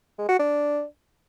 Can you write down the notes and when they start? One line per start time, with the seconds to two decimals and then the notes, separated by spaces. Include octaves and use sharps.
0.19 G#3
0.29 F#4
0.39 D4